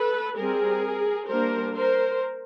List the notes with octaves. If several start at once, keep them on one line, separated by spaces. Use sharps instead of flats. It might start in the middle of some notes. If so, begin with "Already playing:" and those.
Already playing: A4 B4
G3 C4 G#4 A#4
G3 A#3 D4 A#4 C5
A#4 C5